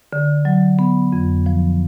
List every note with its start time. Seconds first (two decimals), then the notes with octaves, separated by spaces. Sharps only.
0.13 D3
0.45 F#3
0.79 B3
1.13 F2
1.46 F3